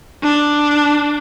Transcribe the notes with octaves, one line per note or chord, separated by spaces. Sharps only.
D4